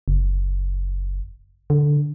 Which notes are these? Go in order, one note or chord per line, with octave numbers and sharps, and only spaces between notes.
F#1
D3